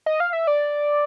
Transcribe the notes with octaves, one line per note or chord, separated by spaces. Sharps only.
D#5
F5
E5
D5